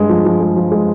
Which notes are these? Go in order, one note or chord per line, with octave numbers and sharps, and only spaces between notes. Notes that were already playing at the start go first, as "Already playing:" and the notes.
Already playing: G2 G#3
F3
F3
G#3
F3
G#3